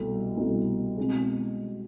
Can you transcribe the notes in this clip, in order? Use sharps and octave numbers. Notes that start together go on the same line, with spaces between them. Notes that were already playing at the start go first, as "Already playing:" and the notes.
Already playing: C2 B2 A3
C2 B2 A3
B2 G#3 C4 G#4